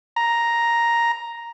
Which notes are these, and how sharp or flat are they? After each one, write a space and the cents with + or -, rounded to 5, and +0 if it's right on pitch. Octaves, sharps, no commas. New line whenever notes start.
A#5 +5